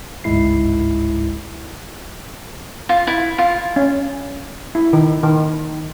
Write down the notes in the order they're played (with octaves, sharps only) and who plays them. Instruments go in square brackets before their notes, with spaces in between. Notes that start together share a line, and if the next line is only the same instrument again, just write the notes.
[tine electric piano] G1 C#2 G#2 G#3 E4 C7
[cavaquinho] F4
E4
F4
[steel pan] C#4
E4
D#3
D#3